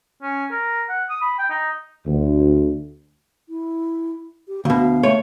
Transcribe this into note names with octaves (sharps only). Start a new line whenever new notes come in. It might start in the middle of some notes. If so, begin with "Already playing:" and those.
C#4
A#4
F#5
D#6
B5
G5
D#4
D2
E4
G4
D2 B2 F5
A3 C#5